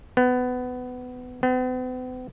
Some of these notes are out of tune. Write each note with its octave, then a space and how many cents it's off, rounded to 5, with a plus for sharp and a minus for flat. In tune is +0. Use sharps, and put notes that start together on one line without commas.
B3 +20
B3 +45